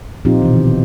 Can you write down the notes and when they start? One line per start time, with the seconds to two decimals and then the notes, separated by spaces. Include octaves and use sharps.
0.25 A#2 F3 C4 D#4 F4 G4
0.42 B2 E3
0.56 D#3